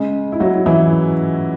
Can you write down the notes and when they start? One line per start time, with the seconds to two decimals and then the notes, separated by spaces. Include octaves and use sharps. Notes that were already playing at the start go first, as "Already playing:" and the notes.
Already playing: C#3 G#3
0.32 E4
0.40 F#3 F#4
0.66 E3 E4